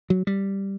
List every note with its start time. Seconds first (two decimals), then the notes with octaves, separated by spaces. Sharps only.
0.10 F#3
0.27 G3